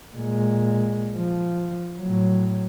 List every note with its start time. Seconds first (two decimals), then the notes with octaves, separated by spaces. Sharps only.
0.15 A#2 G#3
1.16 F3
2.00 A2 F#3